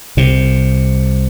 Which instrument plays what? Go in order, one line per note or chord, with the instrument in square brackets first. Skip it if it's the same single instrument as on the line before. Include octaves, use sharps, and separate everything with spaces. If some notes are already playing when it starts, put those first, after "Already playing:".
[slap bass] C2 C3